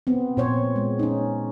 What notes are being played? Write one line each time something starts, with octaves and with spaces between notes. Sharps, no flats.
B3 C4
A#2 C5 C#5
G#3
C#4 D#4